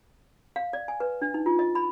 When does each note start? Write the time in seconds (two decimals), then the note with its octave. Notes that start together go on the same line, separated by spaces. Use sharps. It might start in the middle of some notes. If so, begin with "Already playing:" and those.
0.56 F5
0.73 D5
0.88 G#5
1.00 B4
1.22 D4
1.34 D#4
1.46 F4
1.59 D#5
1.75 B5